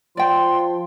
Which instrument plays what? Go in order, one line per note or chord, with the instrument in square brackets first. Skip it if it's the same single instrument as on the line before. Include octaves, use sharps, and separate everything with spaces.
[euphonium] F3 [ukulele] D5 G5 [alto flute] C6